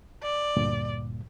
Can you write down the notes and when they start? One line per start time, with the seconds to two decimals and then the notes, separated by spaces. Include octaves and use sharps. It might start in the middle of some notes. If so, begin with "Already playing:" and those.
0.23 D5
0.57 D2 G2 A#2